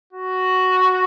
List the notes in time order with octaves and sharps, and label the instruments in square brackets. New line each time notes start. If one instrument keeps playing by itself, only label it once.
[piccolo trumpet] F#4